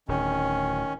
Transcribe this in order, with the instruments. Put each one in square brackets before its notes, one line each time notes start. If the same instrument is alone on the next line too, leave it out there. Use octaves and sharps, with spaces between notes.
[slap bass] D1 [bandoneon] D#3 C#4